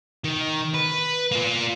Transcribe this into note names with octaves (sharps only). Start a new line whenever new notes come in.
D#3
B4
A#3 F4